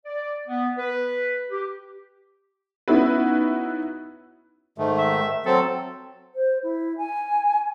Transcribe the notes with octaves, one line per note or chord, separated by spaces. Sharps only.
D5
B3
B4
G4
B3 C#4 D#4 E4 F#4 B4
G#2 D#3 A3
E5
F#3 C4 A4
C5
E4
G#5